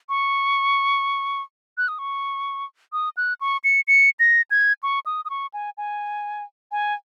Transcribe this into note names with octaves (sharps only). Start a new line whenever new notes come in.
C#6
F#6
D#6
C#6
D#6
F#6
C#6
C#7
C#7
A#6
G#6
C#6
D#6
D#6
C#6
G#5
G#5
G#5